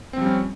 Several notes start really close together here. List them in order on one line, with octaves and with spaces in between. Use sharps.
C4 F3 G3 C#4